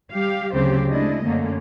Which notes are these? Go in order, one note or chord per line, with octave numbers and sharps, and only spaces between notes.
G3 G4 F5
D2 C#3 F#3 C4 G4 C5
G#3 A3 D4 E4 D#5
F#2 D3 A3 A#3 C#4